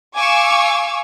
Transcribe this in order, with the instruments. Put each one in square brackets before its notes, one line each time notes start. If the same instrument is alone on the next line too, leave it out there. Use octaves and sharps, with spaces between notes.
[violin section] F5 G#5 C#6 D6 E6